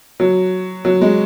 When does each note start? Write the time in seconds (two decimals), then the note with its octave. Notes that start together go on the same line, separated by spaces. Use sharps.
0.20 F#3
0.85 F#3
1.01 G#3